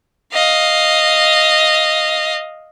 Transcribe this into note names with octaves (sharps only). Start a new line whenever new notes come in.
D#5 F5